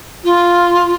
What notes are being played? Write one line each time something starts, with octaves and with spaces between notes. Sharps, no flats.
F4